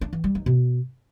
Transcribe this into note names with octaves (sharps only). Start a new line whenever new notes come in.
D4
E3
G3
D#4
B2